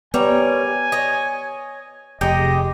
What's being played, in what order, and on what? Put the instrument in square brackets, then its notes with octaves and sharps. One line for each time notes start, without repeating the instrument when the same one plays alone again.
[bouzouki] G3 A#4 C#5 [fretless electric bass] B3 [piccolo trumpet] G#5
[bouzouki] C#5 D#5
[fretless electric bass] F1 [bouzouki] G#3 D#4 G4 [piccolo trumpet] D#5